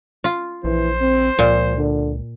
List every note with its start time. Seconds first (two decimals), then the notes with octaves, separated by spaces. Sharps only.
0.24 F4
0.64 A#1 E3 C5
1.01 C4
1.39 C#2 A#2 F3
1.77 D3